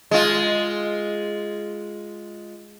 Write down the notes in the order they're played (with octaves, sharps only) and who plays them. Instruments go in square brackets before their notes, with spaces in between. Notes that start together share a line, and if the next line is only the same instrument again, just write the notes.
[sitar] G#3 F4